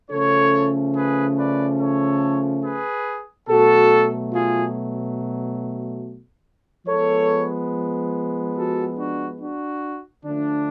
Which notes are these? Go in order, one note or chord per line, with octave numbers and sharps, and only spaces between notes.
C#3 F3 A3 C#4 A4 C#5
G#4 B4
B4 D5
A4 C#5
G#4 B4
B2 F#3 A3 F#4 A4
F4 G#4
F3 G#3 B3 A4 C#5
F#4 A4
D4 F#4
D4 F#4
D3 F3 A3 D4